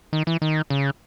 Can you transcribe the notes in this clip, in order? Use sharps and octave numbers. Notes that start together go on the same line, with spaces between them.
D#3
E3
D#3
C#3